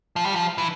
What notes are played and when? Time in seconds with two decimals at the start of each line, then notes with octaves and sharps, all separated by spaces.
0.16 F3
0.26 G3
0.36 F3
0.58 E3